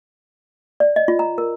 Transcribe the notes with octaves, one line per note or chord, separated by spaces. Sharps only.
D5
D#5
F4
A#5
A#4